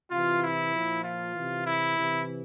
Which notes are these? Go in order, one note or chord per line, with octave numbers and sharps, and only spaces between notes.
C3 E3 F4
E4
A#2 F3
F4
C3 E3
E4
C3 E3